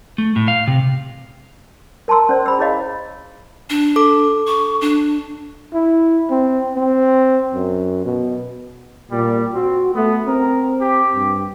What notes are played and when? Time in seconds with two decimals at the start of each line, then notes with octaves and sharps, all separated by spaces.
0.18 A3
0.36 A2
0.48 F5
0.67 C3
2.08 A#4 A5 A#5 C6 E6
2.29 C#4 C5 D5
2.46 G#4 B5 E6
2.59 E4 G#4 C#5 D#5 F5
3.70 D4
3.96 A4 D6
4.47 C#6
4.81 D4
5.74 E4
6.30 C4
6.75 C4
7.54 F#2
8.05 B2
9.11 A#2 G3
9.54 C4 F#4
9.95 A3 B3
10.26 C4 A#4
10.81 G4
11.15 G2